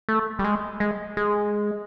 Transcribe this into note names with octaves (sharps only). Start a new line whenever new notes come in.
A3
G3
G#3
G#3
G#3